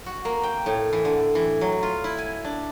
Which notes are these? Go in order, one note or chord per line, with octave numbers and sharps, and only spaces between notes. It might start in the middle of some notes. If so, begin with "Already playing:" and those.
F#4
A#3
G5
A2
E3
D3
E3
F#3
F4
E4
G#5
D4